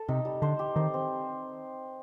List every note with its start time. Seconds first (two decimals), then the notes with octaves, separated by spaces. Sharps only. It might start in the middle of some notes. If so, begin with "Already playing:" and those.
Already playing: A4
0.08 C3 D#4
0.25 G3
0.42 D3 C5
0.59 G4
0.76 D#3 C4
0.94 C4